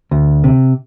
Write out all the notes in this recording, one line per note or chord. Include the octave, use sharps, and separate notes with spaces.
D2
C3